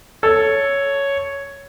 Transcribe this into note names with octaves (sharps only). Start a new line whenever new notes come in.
A4 C#5